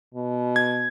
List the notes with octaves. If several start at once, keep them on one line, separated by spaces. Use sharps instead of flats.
B2
G#6